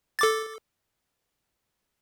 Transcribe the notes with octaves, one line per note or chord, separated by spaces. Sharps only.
A4 D6 A6